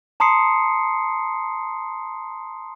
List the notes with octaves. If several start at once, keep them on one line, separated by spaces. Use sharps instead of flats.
A5 A#5 C6 D#6 C7 C#7